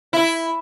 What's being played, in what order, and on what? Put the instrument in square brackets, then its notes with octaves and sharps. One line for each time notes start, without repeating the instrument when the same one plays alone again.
[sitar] E4